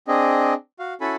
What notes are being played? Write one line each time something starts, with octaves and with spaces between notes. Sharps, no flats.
C4 D4 G#4 D#5
F#4 F5
C#4 E4 F#4 A4 G#5 B5